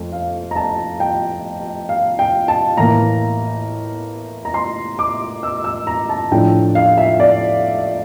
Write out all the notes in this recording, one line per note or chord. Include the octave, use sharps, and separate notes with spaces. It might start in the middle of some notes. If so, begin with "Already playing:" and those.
Already playing: F2 A3
F5
A#5
A5
G5
F5
G5
A5
A2 E3 A#3 A#5
A#5
C6
D6
E6
E6
A#5
A5
A2 F3 A3 D4 G5
F5
E5
D5